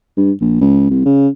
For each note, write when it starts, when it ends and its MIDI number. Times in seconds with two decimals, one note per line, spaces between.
0.17 0.32 43
0.41 0.60 34
0.61 0.86 37
0.90 1.02 36
1.05 1.28 49